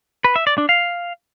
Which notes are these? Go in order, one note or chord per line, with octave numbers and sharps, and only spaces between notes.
B4
E5
D5
D4
F5